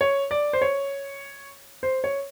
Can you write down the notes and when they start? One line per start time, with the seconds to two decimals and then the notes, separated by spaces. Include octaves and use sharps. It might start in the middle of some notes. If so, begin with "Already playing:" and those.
0.01 C#5
0.31 D5
0.53 C5
0.62 C#5
1.83 C5
2.04 C#5